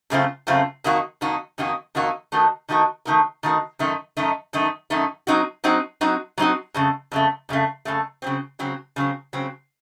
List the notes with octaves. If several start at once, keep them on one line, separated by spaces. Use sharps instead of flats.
F#2 C#3 A3 C4 F4
F#2 C#3 A3 C4 F4
F2 D#3 A#3 D#4 F#4
F2 D#3 A#3 D#4 F#4
F2 D#3 A#3 D#4 F#4
F2 D#3 A#3 D#4 F#4
D#3 A3 D#4 F#4 A#4
D#3 A3 D#4 F#4 A#4
D#3 A3 D#4 F#4 A#4
D#3 A3 D#4 F#4 A#4
F#2 D#3 A3 D#4
F#2 D#3 A3 D#4
F#2 D#3 A3 D#4
F#2 D#3 A3 D#4
F#3 C4 D#4 F#4
F#3 C4 D#4 F#4
F#3 C4 D#4 F#4
F#3 C4 D#4 F#4
F2 C#3 A3
F2 C#3 A3
F2 C#3 A3
F2 C#3 A3
C#3 F#3 C4
C#3 F#3 C4
C#3 F#3 C4
C#3 F#3 C4